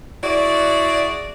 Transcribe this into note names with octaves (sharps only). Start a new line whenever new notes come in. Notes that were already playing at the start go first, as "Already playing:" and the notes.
E4 F#4 G#4 D5